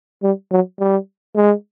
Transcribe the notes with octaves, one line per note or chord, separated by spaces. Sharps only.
G3
F#3
G3
G#3